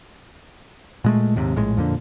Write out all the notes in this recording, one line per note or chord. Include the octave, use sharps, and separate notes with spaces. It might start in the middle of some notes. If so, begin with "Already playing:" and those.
A#2 G#3 A3
D#2 G#2 C3
A#1 A2 G#3
F2 A#2 D3